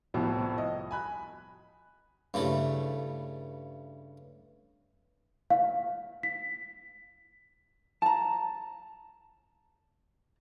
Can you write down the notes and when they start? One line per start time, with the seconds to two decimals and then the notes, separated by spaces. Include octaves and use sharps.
0.14 C2 A2 F3 B3
0.58 D#5
0.91 G#5 B5 F#6
2.34 G2 C#3 A3 E4 A4
5.50 F5
6.23 B6
8.02 A5 A#5